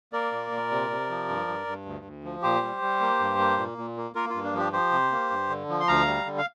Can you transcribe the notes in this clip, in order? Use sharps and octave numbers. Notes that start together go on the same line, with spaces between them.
A#3 A#4 D5
A#2
A#2
C3
C3
F3
G2
G2
G2
D2
D2
F3
A#2 G4 C5
G3
G3
A#3
G2
A#3
A#2
A#2
A#3
A#3 F4 A#4
F4
G2
D4
F3 D4 G4
F3 G4 C5
C3
A#3
G2
D3
F3
C6
D2 F5 A#5
G3
D3
F5